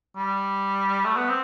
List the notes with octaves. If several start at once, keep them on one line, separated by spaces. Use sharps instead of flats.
G3
A3
B3
C4